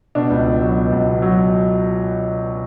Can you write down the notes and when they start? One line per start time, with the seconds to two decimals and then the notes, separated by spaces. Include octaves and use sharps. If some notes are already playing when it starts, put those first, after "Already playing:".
0.15 B2 D4
0.30 C#2
0.46 C#2
0.61 F#3
0.77 B2
0.92 C#2
1.07 B2
1.22 F#3